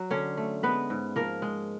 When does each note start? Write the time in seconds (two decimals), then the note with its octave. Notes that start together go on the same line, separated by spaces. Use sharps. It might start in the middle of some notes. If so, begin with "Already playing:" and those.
Already playing: F#3
0.10 D3 C#4 C#5
0.37 A3
0.63 G#3 B3 B4
0.90 G#2
1.16 F3 A#3 A#4
1.42 G#3